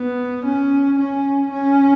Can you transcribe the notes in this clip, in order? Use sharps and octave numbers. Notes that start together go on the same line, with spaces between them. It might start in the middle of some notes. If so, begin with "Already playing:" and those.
Already playing: B3
C#4
C#4
C#4